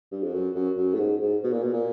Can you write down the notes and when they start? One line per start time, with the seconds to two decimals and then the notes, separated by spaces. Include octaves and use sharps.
0.12 G2
0.24 F2
0.34 F#2
0.55 F#2
0.77 F#2
0.94 A2
0.99 G#2
1.21 G#2
1.44 B2
1.53 A#2
1.63 B2
1.73 A#2